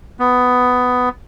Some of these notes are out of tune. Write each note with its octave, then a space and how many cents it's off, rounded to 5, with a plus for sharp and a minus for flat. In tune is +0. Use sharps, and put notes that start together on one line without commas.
B3 +10